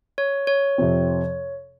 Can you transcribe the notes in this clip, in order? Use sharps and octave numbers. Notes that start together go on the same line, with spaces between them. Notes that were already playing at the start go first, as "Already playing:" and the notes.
C#5
C#5
F2 C3 F3 C4